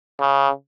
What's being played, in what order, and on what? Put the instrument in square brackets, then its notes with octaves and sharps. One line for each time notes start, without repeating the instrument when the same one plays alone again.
[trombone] C#3